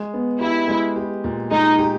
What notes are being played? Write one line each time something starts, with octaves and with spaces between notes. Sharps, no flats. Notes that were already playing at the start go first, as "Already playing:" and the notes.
Already playing: G#3
B3
E4 G4
G#3
G4
A#2
G#3 D#4
G4